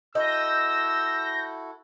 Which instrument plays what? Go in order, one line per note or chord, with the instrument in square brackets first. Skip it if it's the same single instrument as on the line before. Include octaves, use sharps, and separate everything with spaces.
[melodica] E4 F#4 A4 [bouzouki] D#5 [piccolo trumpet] E6 [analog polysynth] G6 A#6